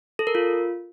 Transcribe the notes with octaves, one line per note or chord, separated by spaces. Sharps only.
A4
A#4
F4